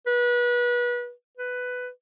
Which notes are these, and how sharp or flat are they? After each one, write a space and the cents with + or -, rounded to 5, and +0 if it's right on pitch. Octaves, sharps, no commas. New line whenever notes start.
B4 -30
B4 +10